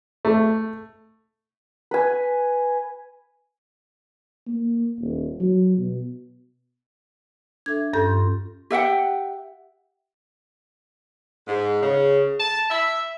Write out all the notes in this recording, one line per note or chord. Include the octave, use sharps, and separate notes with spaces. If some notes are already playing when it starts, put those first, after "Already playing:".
A3
B4 G#5
A#3
D#1
F#3
B2
D4 A4 E5 G#6
G2 C#4 F4 A4 C6 G6
G4 E5 F#5 G5
G#2
C#3
A5
E5